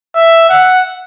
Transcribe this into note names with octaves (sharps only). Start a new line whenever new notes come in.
E5
F#5